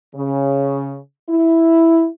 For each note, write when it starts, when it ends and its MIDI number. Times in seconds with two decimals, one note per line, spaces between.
0.15 0.97 49
1.30 2.07 64